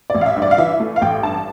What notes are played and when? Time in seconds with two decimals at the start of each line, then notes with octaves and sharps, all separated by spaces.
0.10 A1 D5
0.21 F5
0.26 E5
0.36 G2
0.42 D5
0.51 F5
0.58 E3 E5
0.80 A3
0.96 F5
1.02 A1 G5
1.23 G2 A5